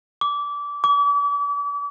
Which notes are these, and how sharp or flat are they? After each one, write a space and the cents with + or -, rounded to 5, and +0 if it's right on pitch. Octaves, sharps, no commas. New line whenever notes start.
D6 -20
D6 -40